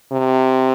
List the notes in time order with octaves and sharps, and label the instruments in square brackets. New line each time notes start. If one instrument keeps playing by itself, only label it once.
[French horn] C3